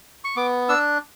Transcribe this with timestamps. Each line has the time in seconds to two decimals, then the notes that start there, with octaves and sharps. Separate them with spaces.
0.24 C#6
0.36 B3 D6
0.69 D4 E6